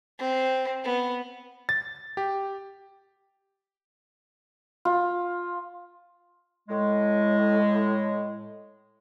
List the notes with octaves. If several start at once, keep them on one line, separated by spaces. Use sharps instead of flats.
C4
B3
A6
G4
F4
A2 G#3